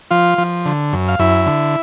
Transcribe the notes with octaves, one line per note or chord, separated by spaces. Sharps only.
F3 F4 F5
F3
D3
F#2
F5
F#2 E4 E5
D3